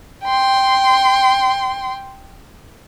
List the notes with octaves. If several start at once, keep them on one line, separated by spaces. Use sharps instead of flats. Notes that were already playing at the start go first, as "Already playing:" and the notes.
G5 C6